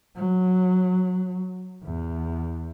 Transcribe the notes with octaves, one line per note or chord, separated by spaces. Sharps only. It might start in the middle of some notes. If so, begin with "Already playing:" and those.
F#3
E2